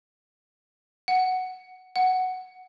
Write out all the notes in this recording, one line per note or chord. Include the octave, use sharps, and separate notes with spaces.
F#5
F#5